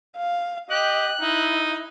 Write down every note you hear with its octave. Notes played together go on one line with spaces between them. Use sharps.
F5
G4 D#5 G5 F#6
D#4 E4